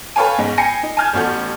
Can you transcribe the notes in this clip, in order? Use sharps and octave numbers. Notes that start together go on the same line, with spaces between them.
A4 B4 C#5 F5 G5 G#5
E2 G#2 G#3 C#4
G5 G#5 B5 A#6 C7 C#7
D#4
G#5 A5 F6 G6 G#6
A1 E2 C#4 F#4 A4 G6